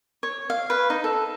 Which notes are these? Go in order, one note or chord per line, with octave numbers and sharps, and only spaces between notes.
C#5
F5
B4
D#4
A4